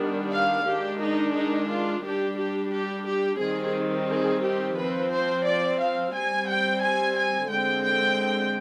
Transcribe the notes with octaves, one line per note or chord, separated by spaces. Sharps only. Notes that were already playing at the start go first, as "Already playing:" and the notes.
Already playing: D#3 G3 B3 D4
F5
D#3 G#3 D4 G4
D#4
D#4
F4
G3 D4 G4
G4
G4
G4
D#3 G3 C4 G#4
G#4
G4
F3 C4 B4
C5
D5
F5
G3 C4 G#5
G5
G#5
G#5
D3 G#3 C4 G5
G5